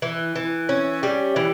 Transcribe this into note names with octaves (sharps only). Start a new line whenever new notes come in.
E3
E3
C#4
G3
E3